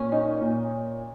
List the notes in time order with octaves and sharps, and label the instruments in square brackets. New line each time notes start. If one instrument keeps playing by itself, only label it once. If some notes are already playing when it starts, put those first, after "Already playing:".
Already playing: [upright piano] A#2 [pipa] C#4
[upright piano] D#4
A#2